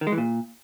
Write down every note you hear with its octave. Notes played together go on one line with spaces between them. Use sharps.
D#3
G#3
E3
A#2